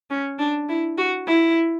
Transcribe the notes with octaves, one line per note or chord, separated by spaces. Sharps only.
C#4
D4
E4
F#4
E4